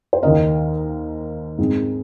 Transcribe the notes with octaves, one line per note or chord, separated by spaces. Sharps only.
C5
D#2 D#3 A#3 A#4 D#5
G#2 G#3 C4